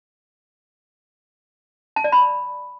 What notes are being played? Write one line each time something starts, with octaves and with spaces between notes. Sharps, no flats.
A5
D5
B5